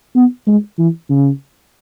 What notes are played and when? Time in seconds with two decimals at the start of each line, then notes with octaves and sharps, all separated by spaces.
0.16 B3
0.47 G#3
0.79 E3
1.10 C#3